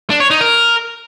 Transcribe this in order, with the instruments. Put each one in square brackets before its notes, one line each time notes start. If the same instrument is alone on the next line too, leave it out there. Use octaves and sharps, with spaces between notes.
[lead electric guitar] D4
C#5
D#4
A#4